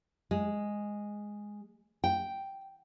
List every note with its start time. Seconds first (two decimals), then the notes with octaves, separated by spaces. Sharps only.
0.31 G#3
2.04 G5